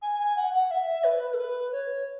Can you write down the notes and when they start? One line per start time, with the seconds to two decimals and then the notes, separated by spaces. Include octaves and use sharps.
0.02 G#5
0.20 G#5
0.37 F#5
0.54 F#5
0.71 E5
1.04 B4
1.34 A4
1.38 B4
1.72 C#5